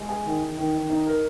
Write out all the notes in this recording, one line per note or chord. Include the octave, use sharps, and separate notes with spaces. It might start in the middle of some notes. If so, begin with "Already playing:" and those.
Already playing: G#3
G#4
D#3
D#3
D#3
D#3
D#4
A#4